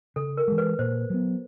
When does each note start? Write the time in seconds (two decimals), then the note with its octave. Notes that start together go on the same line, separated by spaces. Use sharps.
0.16 C#3 A4
0.37 A#4
0.48 E3 G#3
0.58 B4
0.79 A#2 C5
1.10 F#3 B3